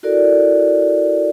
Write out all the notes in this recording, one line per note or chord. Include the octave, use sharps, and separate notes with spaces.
E4 F#4 A4 A#4 D5